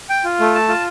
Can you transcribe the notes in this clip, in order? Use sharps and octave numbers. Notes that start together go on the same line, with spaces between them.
G5
F4
A3
A5
F4